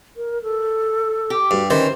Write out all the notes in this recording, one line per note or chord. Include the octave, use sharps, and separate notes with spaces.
A#4
A4
G4
G2 F#4
D#3 E3 C#4 C5